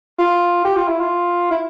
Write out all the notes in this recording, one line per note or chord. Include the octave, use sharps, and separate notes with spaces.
F4
G4
F4
E4
F4
E4